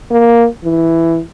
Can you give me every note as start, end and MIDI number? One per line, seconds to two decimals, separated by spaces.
0.11 0.47 58
0.64 1.20 52